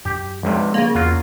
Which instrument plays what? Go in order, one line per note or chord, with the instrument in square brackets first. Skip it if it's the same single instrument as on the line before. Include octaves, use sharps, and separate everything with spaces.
[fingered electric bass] F#2 [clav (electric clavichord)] G4
[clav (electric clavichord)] B1 G2 C3 [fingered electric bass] F3 G#3
[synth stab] C#3 A#3
[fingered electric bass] E2 [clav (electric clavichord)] F#3 F4